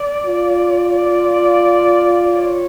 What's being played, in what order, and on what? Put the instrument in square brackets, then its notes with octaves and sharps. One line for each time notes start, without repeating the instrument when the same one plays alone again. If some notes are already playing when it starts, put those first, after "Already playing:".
Already playing: [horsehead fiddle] D5
[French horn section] F4
[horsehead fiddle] D5
C#5